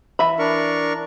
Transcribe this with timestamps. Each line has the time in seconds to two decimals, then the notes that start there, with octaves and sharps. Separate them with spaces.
0.19 E3 E5 B5
0.39 D4 A#4 C#6